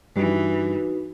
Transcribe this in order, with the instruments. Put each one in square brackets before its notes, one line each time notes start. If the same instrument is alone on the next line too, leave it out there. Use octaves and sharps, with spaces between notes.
[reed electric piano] G2 G3 D4 [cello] E3 [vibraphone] D#4 F#4 B4